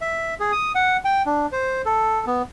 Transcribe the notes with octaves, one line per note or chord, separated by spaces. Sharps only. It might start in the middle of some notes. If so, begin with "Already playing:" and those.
E5
G#4
D#6
F#5
G5
D4
C5
A4
B3